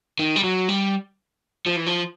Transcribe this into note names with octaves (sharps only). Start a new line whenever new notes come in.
D#3
G3
F#3
G3
F3
E3
F3